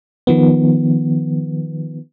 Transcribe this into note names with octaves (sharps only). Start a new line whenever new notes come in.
D#3 F3 B3